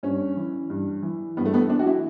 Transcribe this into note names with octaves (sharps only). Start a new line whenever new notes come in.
G2 C#4
E3
G2
E3
G2 B3
A3
B3
E3 D4
F#4
E4